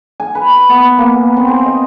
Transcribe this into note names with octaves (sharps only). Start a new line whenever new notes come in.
G#5
B4
B3
A#3
B3
C4
G#5
D#5